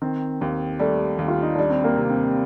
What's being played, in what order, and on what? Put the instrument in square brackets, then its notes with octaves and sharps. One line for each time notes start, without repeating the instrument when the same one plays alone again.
[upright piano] D#3 [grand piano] C4
[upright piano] D#2 [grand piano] C4
[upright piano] G3 [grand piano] A3
[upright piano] D#2
[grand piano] F4
D#4
[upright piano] G3 [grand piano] D4
[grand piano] C4
A#3
[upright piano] C3
[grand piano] C4